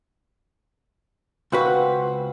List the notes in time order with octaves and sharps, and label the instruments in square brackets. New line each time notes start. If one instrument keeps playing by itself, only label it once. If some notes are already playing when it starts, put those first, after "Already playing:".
[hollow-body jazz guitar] C#2 F#4 B4 [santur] C4 F5 F#5